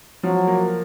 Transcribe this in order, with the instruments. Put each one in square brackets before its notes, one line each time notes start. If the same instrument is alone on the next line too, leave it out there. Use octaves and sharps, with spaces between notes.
[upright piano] F3 [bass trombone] F#3
[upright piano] A#3